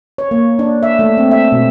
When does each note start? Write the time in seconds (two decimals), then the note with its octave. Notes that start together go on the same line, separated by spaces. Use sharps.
0.18 C#5
0.31 A#3
0.59 D4
0.83 E5
0.99 A3
1.17 C4
1.31 E5
1.52 B2